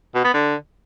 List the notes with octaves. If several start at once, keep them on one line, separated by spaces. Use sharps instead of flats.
B2
B3
D3